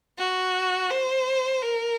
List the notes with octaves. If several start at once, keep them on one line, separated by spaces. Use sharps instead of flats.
F#4
C5
A#4